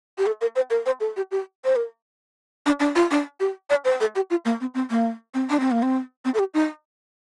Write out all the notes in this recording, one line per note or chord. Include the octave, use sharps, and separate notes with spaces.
G4
A4
A#4
C5
A#4
C5
A4
G4
G4
C5
A#4
D4
D4
F4
D4
G4
D5
C5
A4
G4
F4
A#3
C4
C4
A#3
C4
D4
C4
A#3
C4
C4
A4
G4
D#4